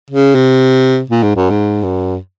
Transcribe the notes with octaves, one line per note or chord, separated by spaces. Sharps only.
C#3
C3
A#2
G#2
F#2
G#2
F#2